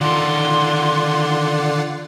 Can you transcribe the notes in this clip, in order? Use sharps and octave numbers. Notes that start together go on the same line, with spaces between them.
D3 D#3 F4 D5 F#5 C6